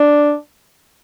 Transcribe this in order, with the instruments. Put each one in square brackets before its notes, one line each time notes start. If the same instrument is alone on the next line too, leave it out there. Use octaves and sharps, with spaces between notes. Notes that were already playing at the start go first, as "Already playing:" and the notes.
Already playing: [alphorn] D4